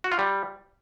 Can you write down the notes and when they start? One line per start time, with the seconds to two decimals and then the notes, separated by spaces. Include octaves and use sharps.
0.04 F#4
0.12 F4
0.19 G3